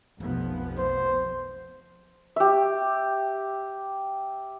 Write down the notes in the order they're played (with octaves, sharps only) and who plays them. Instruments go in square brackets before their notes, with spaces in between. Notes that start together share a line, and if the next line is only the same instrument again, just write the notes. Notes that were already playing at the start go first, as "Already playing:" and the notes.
[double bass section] F1 F3 B3 [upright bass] B1
[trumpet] C5
[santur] G4 E5